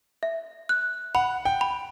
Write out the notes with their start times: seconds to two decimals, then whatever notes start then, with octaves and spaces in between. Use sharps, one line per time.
0.23 E5
0.69 F#6
1.15 F#5 B5
1.45 G5
1.61 B5